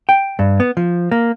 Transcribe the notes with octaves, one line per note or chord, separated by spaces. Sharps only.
G5
G2
B3
F3
A#3